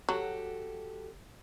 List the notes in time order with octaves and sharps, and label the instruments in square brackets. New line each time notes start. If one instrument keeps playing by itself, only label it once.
[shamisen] F#3 [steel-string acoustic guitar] F#4 G4 A4